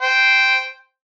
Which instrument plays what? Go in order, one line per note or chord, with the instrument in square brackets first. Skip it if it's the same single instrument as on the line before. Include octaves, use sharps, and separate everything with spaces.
[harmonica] C5 G5